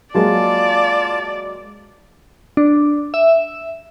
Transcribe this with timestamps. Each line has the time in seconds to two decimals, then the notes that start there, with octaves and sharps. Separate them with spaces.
0.15 F#3 G#3 A#3 F4 D5 A5
2.57 D4
3.14 E5